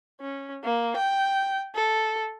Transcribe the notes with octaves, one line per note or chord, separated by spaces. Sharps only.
C#4
A#3
G5
A4